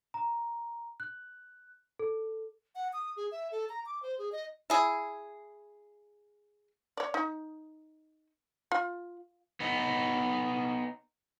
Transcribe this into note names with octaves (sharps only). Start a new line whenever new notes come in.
A#5
F#6
A4
F#5
D#6
G#4
E5
A4
A#5
D6
C5
G#4
D#5
E4 G#4
C#5 D5
D#4
F4
B3 D#4